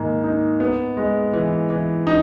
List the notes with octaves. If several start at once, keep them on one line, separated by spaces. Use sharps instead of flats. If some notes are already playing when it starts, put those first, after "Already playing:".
Already playing: G#2 D#3 A#3
D#4
B3
G#3
E3
E3
D#4